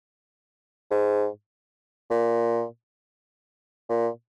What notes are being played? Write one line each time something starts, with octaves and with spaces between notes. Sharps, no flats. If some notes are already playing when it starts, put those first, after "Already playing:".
G#2
A#2
A#2